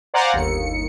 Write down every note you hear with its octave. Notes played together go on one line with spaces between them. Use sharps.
C5 D5 F5 F#5 G#5 A#5
G1 D#2 C#7